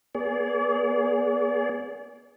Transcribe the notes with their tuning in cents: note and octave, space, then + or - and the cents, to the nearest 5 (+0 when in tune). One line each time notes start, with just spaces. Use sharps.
B3 -30 G#4 +0 D5 -40